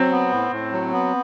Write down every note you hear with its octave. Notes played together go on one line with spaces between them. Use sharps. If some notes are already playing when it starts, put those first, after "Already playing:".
Already playing: F#3 C4
B3
A2
A2
F#3
B3